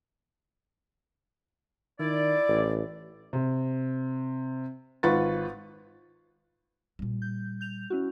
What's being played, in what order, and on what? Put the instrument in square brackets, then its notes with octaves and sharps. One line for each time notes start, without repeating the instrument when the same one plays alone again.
[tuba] D#3 [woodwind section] E4 D5
[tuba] A1
[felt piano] C3
G#1 F4 B4 F#5 C#6 A6
[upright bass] A#2 G3
[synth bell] G6
G6 F7
C#4 E4 F#4